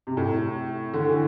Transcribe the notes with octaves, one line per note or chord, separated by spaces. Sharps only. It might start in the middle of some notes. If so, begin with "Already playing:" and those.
C3
A2
D3
E3